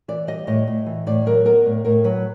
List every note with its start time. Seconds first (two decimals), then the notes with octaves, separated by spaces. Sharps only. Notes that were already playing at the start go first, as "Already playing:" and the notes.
0.08 E3 D5
0.27 G3 D#5
0.47 A2 D#5
0.67 A2
0.86 E3
1.07 A2 D5
1.26 F#3 A#4
1.45 B3 A#4
1.66 A2
1.84 A2 A#4
2.04 F#3 B4